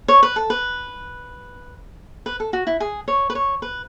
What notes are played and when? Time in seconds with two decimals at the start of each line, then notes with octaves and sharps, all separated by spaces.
0.08 C#5
0.23 B4
0.36 A4
0.50 B4
2.26 B4
2.40 A4
2.53 F#4
2.67 E4
2.80 G#4
3.08 C#5
3.30 B4
3.35 C#5
3.62 B4